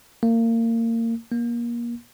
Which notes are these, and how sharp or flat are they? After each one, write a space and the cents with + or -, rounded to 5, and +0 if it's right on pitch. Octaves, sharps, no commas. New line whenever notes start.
A#3 -30
A#3 +25